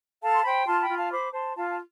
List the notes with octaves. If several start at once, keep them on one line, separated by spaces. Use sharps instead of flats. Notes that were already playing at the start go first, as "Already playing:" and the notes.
A4 F5 A5
C6
C5 G5 B5
F4 A5 C6
G5 B5
F4
F5 A5
C5 B5 D6
C5 A5 C6
F4 F5 A5
A5